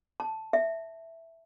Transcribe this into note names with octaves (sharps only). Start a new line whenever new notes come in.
A5
E5